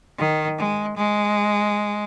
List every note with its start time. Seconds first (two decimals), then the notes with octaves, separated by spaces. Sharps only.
0.18 D#3
0.58 G#3
0.96 G#3